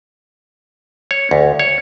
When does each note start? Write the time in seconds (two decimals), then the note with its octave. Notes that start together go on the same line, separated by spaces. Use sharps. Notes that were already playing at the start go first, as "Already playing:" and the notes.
1.11 C#5
1.31 D2
1.59 C#5